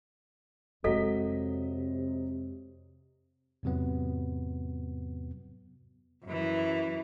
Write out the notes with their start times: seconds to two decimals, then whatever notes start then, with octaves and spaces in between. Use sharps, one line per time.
0.84 F2 C3 F#3 G#3 A4 D#5 B6
3.63 E2 G#2 C3 F#3 B3
6.25 F#2 E3